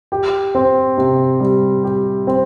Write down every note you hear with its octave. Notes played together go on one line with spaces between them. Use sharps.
G4
C4
C3
G3
G4
C4